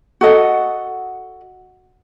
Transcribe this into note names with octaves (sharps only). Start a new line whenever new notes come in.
F#4 A4 D#5 F#5